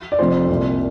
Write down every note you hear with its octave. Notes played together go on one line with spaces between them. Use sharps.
D5
F1 F2 C3 F3 C5
C2 A#2 G3